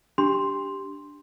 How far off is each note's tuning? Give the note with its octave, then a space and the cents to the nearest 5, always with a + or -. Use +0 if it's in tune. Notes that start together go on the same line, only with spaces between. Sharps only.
D4 +0 G4 +0 C6 +0